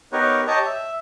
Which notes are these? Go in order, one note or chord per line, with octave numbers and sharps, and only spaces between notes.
B3 D#4 G4 A#4 B4 C#5
G4 C#5 D#5 A5 A#5
E5